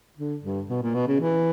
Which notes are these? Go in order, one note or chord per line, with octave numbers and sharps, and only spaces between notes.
D3
G2
B2
A#2
B2
C#3
E3